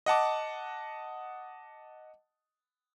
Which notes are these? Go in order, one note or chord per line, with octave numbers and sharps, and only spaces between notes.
D#5 F#5 A5 D6